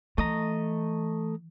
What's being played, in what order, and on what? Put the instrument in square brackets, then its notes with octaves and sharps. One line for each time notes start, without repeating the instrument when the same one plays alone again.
[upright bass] E3 [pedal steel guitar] A3 D#5 A#5